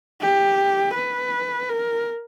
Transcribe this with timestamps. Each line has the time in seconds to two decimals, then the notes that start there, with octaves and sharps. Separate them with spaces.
0.21 G4
0.95 B4
1.69 A#4